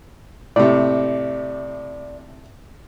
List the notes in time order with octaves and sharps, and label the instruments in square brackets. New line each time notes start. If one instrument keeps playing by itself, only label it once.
[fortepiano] A2 C3 [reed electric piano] D5